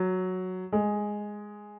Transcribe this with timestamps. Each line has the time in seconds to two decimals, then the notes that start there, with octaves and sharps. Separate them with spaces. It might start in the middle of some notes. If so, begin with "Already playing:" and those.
Already playing: F#3
0.72 G#3